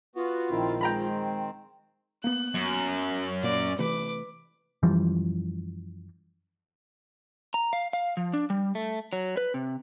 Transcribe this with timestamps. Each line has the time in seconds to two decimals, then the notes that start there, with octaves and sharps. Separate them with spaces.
0.16 B3 F4 F#4
0.50 A#1 D#3 C4 E4
0.81 G#3 G5 A#5 B5
2.24 A#3 B3 F#6
2.55 F#2
3.43 A#2 A#3 D5
3.79 C3 E3 A3 B4 D6
4.83 F#2 E3 F3 G3
7.54 A#5
7.73 F5
7.93 F5
8.17 F3
8.33 D4
8.50 G3
8.75 A3
9.13 F#3
9.37 B4
9.54 C3